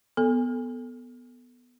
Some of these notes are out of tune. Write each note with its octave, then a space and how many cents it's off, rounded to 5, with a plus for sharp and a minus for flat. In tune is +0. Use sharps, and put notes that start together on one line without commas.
B3 +0 A4 +0